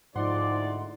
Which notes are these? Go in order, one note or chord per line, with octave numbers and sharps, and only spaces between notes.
D2 G#2 F3 D#4 E4 D5 F#5 C6